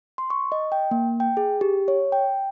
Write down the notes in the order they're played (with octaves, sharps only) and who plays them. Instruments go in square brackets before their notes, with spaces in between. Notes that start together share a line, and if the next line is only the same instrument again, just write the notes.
[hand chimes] C6
C#6
D#5
G5
A#3
G5
G#4
G4
C#5
G5